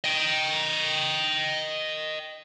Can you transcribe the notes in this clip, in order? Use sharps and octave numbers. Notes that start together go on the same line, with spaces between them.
D#5 G5